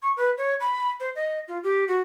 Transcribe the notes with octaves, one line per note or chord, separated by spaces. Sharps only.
C#6
B4
C#5
B5
C5
D#5
F4
G4
F#4